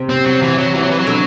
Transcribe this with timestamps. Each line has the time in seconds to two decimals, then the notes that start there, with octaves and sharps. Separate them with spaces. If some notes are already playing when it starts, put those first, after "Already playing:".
Already playing: C3
0.09 C4
0.25 F#3
0.42 E3
0.58 F#3
0.74 E3
0.83 F#3
0.91 E3
0.99 F#3
1.07 B2 D3